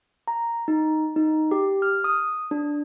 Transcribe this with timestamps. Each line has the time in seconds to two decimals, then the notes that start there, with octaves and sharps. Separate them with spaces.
0.28 A#5
0.68 D#4
1.16 D#4
1.51 G4
1.82 F6
2.04 D#6
2.51 D4